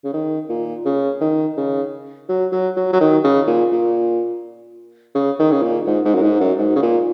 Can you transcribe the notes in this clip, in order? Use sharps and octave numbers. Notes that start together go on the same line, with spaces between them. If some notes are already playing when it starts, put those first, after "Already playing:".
C#3
D#3
A#2
C#3
D#3
C#3
F#3
F#3
F#3
F#3
D#3
C#3
A#2
A#2
C#3
D#3
C#3
A#2
G#2
G#2
F#2
G#2
F#2
G#2
C#3
A#2